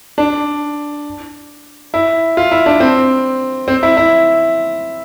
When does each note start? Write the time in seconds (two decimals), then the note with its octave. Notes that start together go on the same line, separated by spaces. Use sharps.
0.18 D4
1.94 E4
2.37 F4
2.51 E4
2.66 D4
2.80 C4
3.68 C4
3.83 E4
3.97 E4